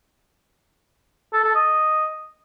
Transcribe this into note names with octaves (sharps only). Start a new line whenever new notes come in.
A4
A4
D#5